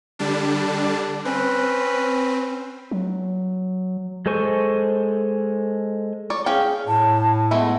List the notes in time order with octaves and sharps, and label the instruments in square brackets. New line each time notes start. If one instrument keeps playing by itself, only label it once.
[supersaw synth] D3 G3 D4
[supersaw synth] C4 [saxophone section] C#4 B4
[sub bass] F#3
[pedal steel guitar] G#3 A4 C5 G#5 C#6
[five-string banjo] C#5 D5
[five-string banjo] C#4 F5 G5 [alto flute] G#4
[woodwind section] A2 [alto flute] A5
[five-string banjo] G#3 A3 E4 [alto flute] B3